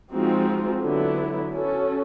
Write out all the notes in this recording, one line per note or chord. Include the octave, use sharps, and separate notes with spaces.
F3 G#3 C4 D#4 F#4
D3 F#3 B3 E4
C#4 F#4 A4